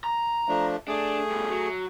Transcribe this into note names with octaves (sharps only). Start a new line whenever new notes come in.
A#5
F3 A3 D4
A3 D4 G#4
G2 B2
F#3